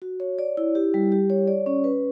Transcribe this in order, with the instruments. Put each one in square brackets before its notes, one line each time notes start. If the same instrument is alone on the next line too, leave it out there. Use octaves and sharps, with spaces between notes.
[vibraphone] F#4
C#5
D5
E4
G4
G3
G4
C#5
D5
C#4
B4